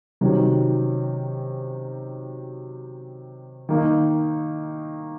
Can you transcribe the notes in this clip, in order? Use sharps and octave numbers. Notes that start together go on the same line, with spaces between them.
C3 D#3 F#3 C#4
D#3 A#3 D#4